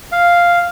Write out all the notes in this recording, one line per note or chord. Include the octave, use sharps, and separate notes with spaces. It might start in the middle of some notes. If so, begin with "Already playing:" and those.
F5